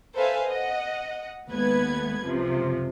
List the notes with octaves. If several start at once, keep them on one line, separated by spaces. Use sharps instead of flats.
A4 B4 C5 E5 F5 G#5
D#5 F#5
D#2 G#3 A3 B3 B4 G#6
C#2 F#2 C3 F3